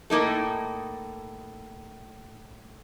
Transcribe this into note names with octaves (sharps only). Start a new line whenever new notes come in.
A2 A#3 D#4 A4